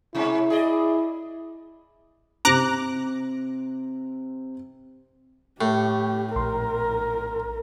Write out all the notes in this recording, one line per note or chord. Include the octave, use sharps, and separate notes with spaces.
B2 G#3 C#4 E4
G#4 D5 D#5
C3 C4 A#5 D6 F#6
A2 G4 C#6
A#1 A#4 C6